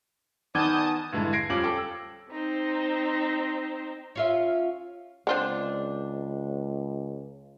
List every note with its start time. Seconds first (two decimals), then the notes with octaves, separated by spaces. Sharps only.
0.55 D#3 B3 D5 G#5 A5 D#6 G6
1.12 G2 D3 E3 G#3
1.33 G#6 A#6 C7 D7
1.50 F2 G3 C#4 F4 D6 F#7
1.63 A4 G5 D6
1.78 E6
2.31 C4 D#4 C5
4.15 C#4 F4 E5
5.27 C#2 D3 G#3 C4 D4 F4 C5